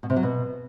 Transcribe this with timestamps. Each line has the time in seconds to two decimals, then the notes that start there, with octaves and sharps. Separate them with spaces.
0.03 B2
0.10 C3
0.16 F#3
0.23 B2